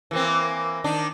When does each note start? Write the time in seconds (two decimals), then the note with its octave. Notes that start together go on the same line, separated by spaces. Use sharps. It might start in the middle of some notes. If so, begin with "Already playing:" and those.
0.11 E3 A#3 C4
0.84 D#3 D4 D#4